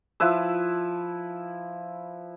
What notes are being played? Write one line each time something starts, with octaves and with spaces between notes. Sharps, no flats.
F3 E4 B4 E6